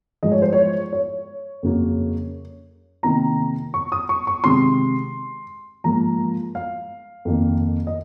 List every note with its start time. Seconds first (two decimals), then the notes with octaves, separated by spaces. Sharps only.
0.23 G#2 F3 G#3 D#5
0.32 C#5
0.42 C5
0.53 C#5
0.93 C#5
1.63 F2 C#3 F#3 A#3
3.03 C3 D#3 A#3 A#5
3.74 C#6
3.92 D#6
4.09 C#6
4.27 C#6
4.44 C3 D#3 G#3 C6
5.84 G#2 F3 A#3 A#5
6.55 F5
7.25 F2 D#3 A#3
7.87 D#5